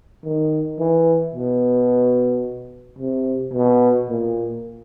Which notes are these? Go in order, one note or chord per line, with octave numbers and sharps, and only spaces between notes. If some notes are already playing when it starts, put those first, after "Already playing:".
D#3
E3
B2
C3
B2
A#2